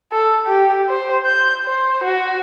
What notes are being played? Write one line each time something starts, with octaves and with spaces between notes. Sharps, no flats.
A4
G4
C5
G6
C5
F#4